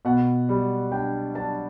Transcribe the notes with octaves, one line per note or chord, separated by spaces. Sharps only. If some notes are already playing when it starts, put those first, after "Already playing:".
B2 F#5
G3
D4 G5
D4 A5